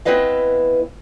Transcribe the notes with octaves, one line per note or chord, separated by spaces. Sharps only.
B3 C4 E4 B4 D#5 F5